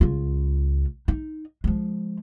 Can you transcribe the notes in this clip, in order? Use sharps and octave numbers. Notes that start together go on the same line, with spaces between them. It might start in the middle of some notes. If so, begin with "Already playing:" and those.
C#2 F4
D#4
F3 G#3